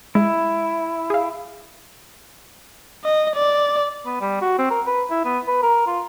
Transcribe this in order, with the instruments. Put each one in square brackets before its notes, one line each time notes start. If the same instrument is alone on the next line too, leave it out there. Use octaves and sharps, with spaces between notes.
[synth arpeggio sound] G#3 [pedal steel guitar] E4
[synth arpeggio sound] G#4 F5
[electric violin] D#5
D5
[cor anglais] B3
G3
F#4
C4
A#4
B4
E4
B3
B4
A#4
F4